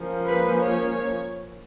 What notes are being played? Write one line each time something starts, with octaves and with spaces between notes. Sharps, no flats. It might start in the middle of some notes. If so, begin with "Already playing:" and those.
Already playing: F3 A#3 C#4
B4
C#5